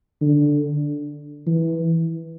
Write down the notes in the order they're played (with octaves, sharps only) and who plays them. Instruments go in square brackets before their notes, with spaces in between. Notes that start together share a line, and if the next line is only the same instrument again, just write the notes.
[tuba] D3
E3